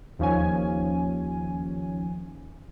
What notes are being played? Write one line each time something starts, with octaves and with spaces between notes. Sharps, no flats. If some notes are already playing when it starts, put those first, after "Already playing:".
D#2 F3 C#4 G#5